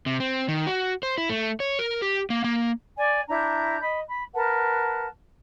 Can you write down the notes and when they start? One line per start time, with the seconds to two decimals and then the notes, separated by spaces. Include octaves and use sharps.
0.06 C3
0.20 C4
0.48 D#3
0.66 F#4
1.03 C5
1.18 E4
1.29 A3
1.60 C#5
1.79 A#4
2.02 G4
2.30 A#3
2.44 A#3
2.97 D5 G#5
3.29 D4 E4 A#5 G6
3.82 D#5 B5
4.08 B5
4.34 A#4 B4 F#5 A5